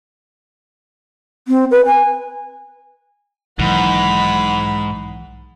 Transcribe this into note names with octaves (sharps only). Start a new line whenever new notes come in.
C4
B4
G#5
B1 G#2 D#3 E3 F#5 B5